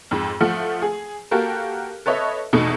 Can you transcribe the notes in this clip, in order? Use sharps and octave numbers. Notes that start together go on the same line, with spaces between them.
F2 G#2
F3 A3 F#5
G#4
A#3 F#4 G4 A4 A#4
A4 B4 C#5 D#5 E5
E2 B2 A3 D#4